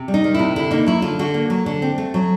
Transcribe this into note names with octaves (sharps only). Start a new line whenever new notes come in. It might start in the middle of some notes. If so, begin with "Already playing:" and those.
Already playing: C3
G3
D#4
D#3
C3 E4
D3 E4
A#3 D#4
F#3 E4
D3 F4
D3 F#4
A#3
F#3
D3
C4
A3
F#3